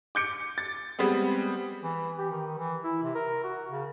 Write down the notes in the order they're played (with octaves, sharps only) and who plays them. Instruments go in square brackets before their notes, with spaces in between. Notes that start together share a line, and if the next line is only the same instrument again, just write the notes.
[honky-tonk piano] D6 G6 C#7 D7
A6
G3 G#3 B3 C4
[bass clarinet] E3
G4
D#3
E3
E4
C3
A#4
F#4
C#3